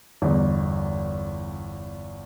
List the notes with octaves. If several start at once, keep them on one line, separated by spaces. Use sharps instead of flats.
G1 E2